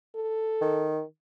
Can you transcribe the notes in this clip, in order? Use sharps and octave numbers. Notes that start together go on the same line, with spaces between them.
A4
D#3